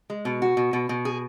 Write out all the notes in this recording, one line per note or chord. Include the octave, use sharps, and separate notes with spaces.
G#3
B2
F#4
B2
B2
B2
G#4